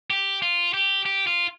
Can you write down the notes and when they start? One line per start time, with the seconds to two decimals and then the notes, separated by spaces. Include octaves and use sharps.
0.10 G4
0.42 F4
0.74 G4
1.06 G4
1.27 F4